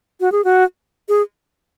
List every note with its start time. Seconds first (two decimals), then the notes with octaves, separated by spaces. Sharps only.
0.20 F#4
0.32 G#4
0.44 F#4
1.09 G#4